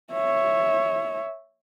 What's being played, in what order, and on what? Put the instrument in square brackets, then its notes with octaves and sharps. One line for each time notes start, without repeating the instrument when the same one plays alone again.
[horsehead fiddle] C#5 E5